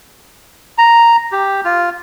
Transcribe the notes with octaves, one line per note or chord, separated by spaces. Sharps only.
A#5
G4
F4